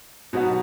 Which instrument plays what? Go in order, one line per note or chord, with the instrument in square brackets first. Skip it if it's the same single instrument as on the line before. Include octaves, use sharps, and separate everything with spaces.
[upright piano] B2 F#3 B3 D#4 F#4